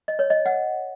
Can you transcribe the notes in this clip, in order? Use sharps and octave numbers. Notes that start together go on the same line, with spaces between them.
D#5
C#5
D#5
F#5